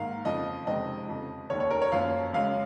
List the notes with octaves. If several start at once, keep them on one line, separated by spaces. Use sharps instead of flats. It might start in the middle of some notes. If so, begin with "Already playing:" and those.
Already playing: G#2 D#3 A#3 F5
F2 C#3 F3 D#5
F2 C3 D#3 G#3 C4 D#5
F2 C#3 F3
F1 D#2 D#3 C#5
C#5
A#4
C#5
F#2 F3 A#3 C#4 F5
F#2 C#3 G#3 C#4 F5